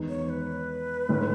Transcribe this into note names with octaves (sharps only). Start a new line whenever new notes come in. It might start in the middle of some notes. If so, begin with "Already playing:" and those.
Already playing: E2 D#3 G#3 B3 D#4
C#5
B4
G#2 D#3 A3 C#4 E4